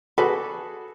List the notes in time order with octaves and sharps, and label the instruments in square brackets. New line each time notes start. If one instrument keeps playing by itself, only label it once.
[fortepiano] F#4 G#4 A4 [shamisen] B4 C5 D5